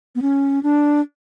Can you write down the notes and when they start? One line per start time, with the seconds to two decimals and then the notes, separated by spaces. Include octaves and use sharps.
0.15 B3
0.22 C#4
0.63 D4